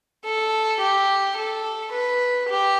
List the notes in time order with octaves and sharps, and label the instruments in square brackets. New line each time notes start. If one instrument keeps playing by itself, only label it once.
[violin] A4
G4
A4
B4
G4